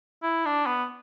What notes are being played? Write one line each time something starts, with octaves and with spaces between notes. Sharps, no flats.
E4
D4
B3